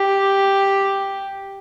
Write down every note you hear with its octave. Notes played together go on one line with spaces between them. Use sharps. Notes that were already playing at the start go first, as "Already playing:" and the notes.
Already playing: G4